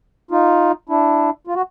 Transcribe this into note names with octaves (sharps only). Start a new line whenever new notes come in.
D#4 F4
D4 E4
F4
F#4